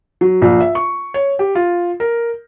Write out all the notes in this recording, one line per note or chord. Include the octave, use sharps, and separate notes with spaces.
F#3
A#1
E5
C#6
C#5
G4
F4
A#4